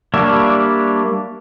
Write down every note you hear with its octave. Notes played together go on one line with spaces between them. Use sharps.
G3 A#3 D4 C#5 E5